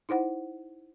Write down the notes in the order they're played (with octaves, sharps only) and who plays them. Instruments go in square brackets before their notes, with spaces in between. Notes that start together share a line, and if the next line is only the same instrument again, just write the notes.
[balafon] D#4 E4 C5 F#5